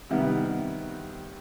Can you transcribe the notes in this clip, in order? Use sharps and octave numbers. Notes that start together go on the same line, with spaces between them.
C3 D#3 G3 B3 E4